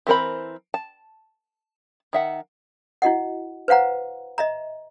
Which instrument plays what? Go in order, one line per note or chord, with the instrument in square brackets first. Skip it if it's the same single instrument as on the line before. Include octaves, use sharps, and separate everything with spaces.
[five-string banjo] E3 C4 A#4 C5 B5
A5
D#3 E5 F#5
[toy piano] E4 F#4 D#5 F#5
B4 C5 F5 F#5 A#5
D#5 E5 A#5